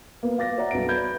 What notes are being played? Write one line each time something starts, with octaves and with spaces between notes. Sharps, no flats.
A#3 B3
F5 D6 A6 A#6
C#5 D5 E5 F#5 A#5
B1 F#3 B3 D7
B4 B5 G6 G#6